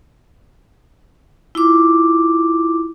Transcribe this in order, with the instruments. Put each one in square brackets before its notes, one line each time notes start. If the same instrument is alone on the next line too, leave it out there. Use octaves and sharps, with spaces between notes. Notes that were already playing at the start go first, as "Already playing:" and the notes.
[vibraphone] E4 F4 D6